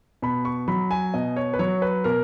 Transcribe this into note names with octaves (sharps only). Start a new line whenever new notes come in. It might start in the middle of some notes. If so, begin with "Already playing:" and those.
B2 B5
C#6
F#3 B5
G#5
B2 D#5
C#5
B4
F#3 C#5
B4
B2 A#4